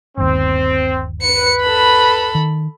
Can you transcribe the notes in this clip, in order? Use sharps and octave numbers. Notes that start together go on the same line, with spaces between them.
G1 D#2 C4
B4 C#7
A4 B5
D#3